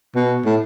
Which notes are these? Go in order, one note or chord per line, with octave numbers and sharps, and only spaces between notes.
B2
A2